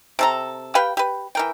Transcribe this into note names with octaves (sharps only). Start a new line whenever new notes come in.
C3 A4 A#5
G4 B4 F5 G5
G4 B4
E3 A#4 G5